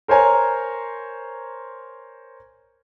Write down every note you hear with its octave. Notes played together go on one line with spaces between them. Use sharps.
A#4 C5 C#5 G#5 A#5